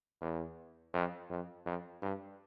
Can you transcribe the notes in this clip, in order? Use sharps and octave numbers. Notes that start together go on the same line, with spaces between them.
E2
F2
F2
F2
G2